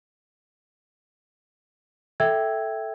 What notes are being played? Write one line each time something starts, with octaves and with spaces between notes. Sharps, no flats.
A4 E5 G5 E6 G#6